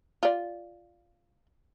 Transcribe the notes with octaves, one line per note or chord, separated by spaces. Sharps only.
F4 D5